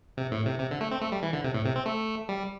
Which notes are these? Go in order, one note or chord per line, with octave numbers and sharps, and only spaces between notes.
C3
A2
C3
C3
D3
A3
C4
A3
G3
E3
D3
C3
A2
C3
C4
A3
G3